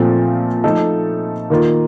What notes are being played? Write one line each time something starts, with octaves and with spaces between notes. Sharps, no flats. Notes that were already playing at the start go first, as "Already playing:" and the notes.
Already playing: A#2 F3 A3 C4
F3 A3 D#4 A4
D#3 A#3 F4